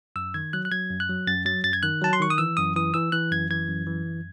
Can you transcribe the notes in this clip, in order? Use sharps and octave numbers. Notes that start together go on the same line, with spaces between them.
F#2 E6
D#3 G#6
F#3 F#6
F#6
F#3 G#6
F#2
F#6
F#3
F#2 A6
F#3 A6
F#2 A6
G#6
D#3 F#6
F#3 A5
C6
D#3 C#6
D#6
E3 E6
F#2 D#6
E3 D#6
E3 E6
E3 F#6
F#2 G#6
E3 G#6
F#2
E3
F#2